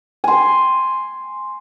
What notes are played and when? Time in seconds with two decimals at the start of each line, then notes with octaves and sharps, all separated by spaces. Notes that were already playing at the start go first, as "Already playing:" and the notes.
0.24 G#5 C6